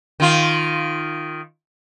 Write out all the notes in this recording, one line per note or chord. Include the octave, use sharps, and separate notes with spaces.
D#3 F4